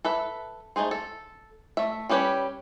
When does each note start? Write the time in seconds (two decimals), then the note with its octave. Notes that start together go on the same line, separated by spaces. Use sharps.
0.05 A4 B4 E5
0.76 A3 A#3 D#4 G#4 C5
0.91 A4
1.77 A3 E5
2.09 G3 C#4 G4 B4 C#5